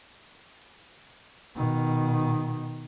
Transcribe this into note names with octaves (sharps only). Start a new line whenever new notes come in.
B2 D#3